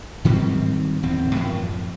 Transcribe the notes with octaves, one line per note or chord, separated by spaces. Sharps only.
G#2 D#3 G3 C4
D1 E2 C4
F#2 A2 F3